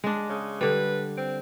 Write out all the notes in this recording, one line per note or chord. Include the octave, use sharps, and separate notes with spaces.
G#3 D4
C#3
D3 G3 B4
C4